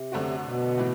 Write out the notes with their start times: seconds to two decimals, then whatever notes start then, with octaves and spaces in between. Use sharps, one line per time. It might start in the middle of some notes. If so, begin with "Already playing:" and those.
Already playing: C3
0.12 F#2 D3 A3 C4 F#4
0.39 C3
0.44 B2
0.78 A2 E3